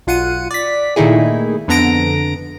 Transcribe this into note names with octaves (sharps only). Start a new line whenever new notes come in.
B1 F4 F#5 C#7 D#7
D5 B6
A#2 D#3 A3 D#4 E4 G#4
F2 D3 B3 A#5 A#6 D7